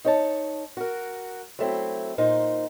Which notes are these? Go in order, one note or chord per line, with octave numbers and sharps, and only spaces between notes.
D#4 C#5 A5
F#4 A#4
F#3 A3 C4 E4
A#2 D#4 C5